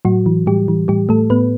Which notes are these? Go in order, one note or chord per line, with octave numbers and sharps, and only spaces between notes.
A2 F#3 F#4
E3
A2 G3 G4
E3
A2 G3 G4
A2 A3 A4
A2 B3 B4